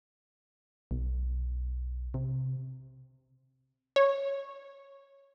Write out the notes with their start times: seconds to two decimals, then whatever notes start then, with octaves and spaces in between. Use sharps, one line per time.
0.91 B1
2.14 C3
3.96 C#5